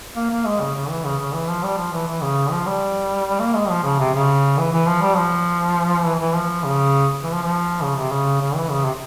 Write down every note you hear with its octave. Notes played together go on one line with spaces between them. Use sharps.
A#3
A#3
G#3
C#3
C#3
E3
C#3
C#3
E3
F3
G3
F3
E3
E3
C#3
F3
G3
A#3
G#3
F3
C#3
C3
C#3
E3
E3
F3
G3
F3
E3
E3
F3
C#3
E3
F3
F3
C#3
C3
C#3
C#3
E3
C#3
C3